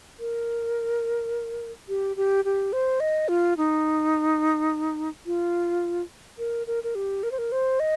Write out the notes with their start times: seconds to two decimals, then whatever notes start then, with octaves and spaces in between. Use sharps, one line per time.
0.19 A#4
1.89 G4
2.16 G4
2.45 G4
2.73 C5
3.00 D#5
3.28 F4
3.57 D#4
5.26 F4
6.38 A#4
6.67 A#4
6.84 A#4
6.95 G4
7.23 A#4
7.32 C5
7.38 A#4
7.52 C5
7.80 D#5